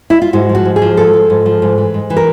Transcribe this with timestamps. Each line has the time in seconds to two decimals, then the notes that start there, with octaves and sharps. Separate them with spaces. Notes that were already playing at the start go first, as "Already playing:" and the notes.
0.10 E4
0.22 F4
0.33 G#2 F#4
0.49 F3
0.55 F#4
0.65 G#2
0.76 G#4
0.82 F3
0.97 G#2 A4
1.13 F3
1.30 G#2
1.46 F3
1.62 G#2
1.78 E3
1.94 G#2
2.10 E3
2.17 A#4